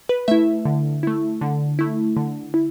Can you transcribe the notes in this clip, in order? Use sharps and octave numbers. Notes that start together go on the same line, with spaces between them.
B4
A3 E4 E5
D3
A3 E4
D3
A3 E4
D3
E4